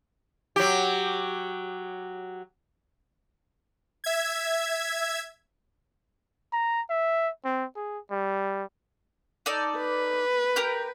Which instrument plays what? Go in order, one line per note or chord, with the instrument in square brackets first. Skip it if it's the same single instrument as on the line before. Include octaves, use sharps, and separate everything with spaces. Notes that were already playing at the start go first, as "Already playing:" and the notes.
[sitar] F#3 G4
[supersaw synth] E5 G#6
[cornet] A#5
E5
C4
G#4
G3
[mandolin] D#4 A4 D5
[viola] B4
[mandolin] G4 A#4 G6